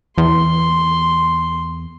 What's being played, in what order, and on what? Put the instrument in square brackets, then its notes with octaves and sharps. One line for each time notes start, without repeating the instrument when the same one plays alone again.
[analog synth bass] E2 [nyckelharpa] C6